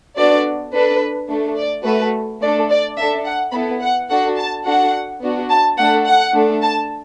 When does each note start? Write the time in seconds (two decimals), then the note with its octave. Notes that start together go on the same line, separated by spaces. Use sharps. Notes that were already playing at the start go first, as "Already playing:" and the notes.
0.17 B3 D4 F#4 A4 D5
0.73 D4 A4 B4
1.29 A3 D4 A4
1.57 D5
1.85 A3 F#4 A4 B4
2.41 A3 D4 A4 D5
2.70 D5
2.97 D4 A4 E5
3.26 F#5
3.53 B3 E4 A4 B5
3.81 F#5
4.09 D4 F#4 A4 F#5
4.37 A5
4.66 D4 F#4 A4 F#5
5.22 B3 D4 F#4
5.50 A5
5.77 A3 D4 A4 F#5
6.06 F#5
6.34 A3 D4 A4
6.62 A5